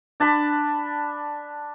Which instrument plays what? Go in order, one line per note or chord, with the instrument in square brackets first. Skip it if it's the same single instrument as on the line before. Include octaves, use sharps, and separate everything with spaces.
[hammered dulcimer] D4 A5 B5